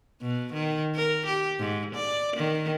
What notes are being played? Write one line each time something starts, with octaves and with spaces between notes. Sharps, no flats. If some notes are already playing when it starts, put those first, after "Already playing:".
B2
D#3
A#4
G4
G#2
D5
D#3